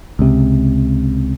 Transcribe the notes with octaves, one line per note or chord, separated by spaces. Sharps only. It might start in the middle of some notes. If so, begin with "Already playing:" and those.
C#2 C3